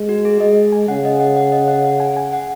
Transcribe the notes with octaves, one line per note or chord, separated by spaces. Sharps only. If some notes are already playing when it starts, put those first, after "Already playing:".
Already playing: G#3
F#4
G#4
G#3 D#5
G#5
C#3 F#5
D#5
F#5
F#5
D#5
F#5
F#5
G#5
G#5
F#5